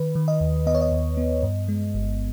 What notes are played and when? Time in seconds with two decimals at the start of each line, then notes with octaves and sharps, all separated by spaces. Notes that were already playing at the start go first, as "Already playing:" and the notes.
Already playing: D#3 B4
0.15 D#3
0.28 D#5
0.41 D#2
0.66 B3 D#5
0.75 C#5
0.81 D#5
0.92 D#2
1.17 B3
1.43 G2
1.68 G#3
1.94 G1